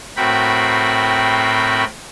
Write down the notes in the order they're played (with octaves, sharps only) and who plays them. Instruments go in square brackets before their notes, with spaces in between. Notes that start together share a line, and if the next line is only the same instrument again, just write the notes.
[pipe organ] A2 C4 F#4 A#4 G5 B5